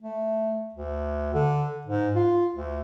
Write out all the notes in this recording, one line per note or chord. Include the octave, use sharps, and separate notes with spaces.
A3
D2
D3
G#2
F4
D2